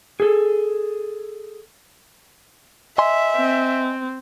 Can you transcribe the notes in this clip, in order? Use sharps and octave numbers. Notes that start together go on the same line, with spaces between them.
G#4 A4
D#5 E5 G#5 C6
C4